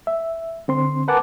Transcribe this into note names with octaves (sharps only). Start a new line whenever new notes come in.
E5
D3 C4 C6
A#4 B4 F#5 G#5 A5 D6